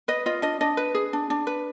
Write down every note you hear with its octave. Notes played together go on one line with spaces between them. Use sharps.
B4 D#5
F4 D#5
D4 D#5
D4 D#5
B4
G#4
D4
D4
B4